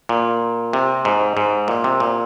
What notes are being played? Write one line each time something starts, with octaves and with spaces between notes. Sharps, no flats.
A#2
C3
G#2
G#2
A#2
C3
A#2